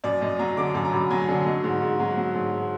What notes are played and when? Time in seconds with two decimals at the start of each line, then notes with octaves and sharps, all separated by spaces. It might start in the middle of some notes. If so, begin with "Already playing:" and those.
0.04 F#2 D5
0.22 F#2 D#5
0.39 F#3 A#5
0.57 D3 D6
0.75 F#2 D6
0.85 A#5
0.92 F#2 B5
1.10 F#3 G#5
1.28 D3
1.46 F#3 D#5
1.64 G#2
1.81 G#2
1.99 F#3
2.17 F#3
2.35 G#2